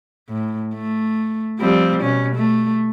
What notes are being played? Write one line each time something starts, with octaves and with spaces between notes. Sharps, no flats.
A2
A3
F3 G3 C4
B2 C#4
A3